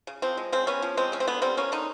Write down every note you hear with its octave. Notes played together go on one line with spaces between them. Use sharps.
C#3
F3 C4
G#3
C#3 C4
B3 C#4
F3
G#3 C4
C#3 C#4
C4
D3 B3
G3 C4
A#3 C#4
D3 D#4